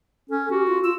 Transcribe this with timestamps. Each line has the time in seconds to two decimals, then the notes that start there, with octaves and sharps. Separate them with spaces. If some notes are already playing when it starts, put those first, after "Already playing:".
0.30 C#4 A4
0.50 F#4 G4
0.67 F4
0.84 F4 E6